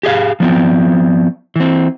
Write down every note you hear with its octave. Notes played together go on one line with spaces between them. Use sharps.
G4 G#4 D#5 F5
F3 B3 C4
E3 C4